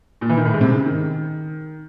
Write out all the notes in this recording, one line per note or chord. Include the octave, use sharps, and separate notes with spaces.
A#2
E3
D#3
A2
G#2
C3
C#3
D#3